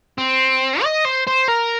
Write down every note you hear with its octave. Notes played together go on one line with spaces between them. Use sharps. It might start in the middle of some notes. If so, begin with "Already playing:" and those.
C4
D#5
C5
C5
A#4